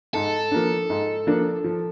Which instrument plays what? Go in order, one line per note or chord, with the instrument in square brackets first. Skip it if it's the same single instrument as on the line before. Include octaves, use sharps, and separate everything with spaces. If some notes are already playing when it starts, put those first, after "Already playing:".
[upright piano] G#2 [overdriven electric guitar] A4
[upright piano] F3 A#3 D4
G#2
F3 A#3 D4
F3